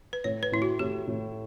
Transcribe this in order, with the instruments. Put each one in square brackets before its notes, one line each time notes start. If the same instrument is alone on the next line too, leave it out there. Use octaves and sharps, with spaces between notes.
[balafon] B4
[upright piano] A2 [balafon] C#5
[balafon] B4
[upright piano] A2 [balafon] E4
[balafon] F#4
[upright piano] A2 [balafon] G4
[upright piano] A2